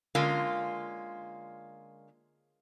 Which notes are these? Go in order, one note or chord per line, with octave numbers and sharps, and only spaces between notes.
D3 G#3 A#3 C#4 F4